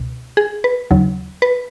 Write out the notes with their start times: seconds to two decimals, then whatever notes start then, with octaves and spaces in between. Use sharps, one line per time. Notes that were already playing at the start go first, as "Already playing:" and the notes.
Already playing: C#2 B2
0.37 G#4
0.64 B4
0.91 D#2 C#3 F#3
1.42 B4